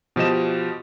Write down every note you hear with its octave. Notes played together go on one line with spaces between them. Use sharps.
B2 F3 G4 D#5 E7